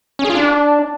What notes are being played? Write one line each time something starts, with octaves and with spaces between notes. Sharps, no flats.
C#4
G#4
F4
D4